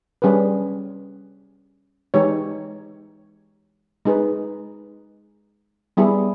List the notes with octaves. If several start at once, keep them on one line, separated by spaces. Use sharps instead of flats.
G3 C#4 G#4 B4
E3 G#3 D#4 G4 C#5
G#3 D#4 G#4 B4
G3 B3 E4 G#4